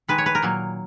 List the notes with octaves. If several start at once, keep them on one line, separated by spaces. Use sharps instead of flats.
D#3 G#3 B4
C#5
B4
A#4
A#2 F#3 A#3